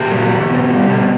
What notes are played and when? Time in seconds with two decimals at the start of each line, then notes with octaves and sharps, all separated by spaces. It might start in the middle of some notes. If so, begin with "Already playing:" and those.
Already playing: A#2 G4
0.10 F#3
0.31 E2
0.50 B2
0.70 G3
0.89 B2